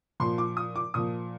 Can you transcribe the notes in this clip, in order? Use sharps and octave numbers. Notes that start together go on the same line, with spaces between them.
A#2 F3 C6
D6
D#6
D6
A#2 F3 D#6